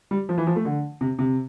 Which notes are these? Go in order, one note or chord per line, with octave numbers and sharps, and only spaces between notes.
G3
F3
E3
F3
A3
D3
C3
C3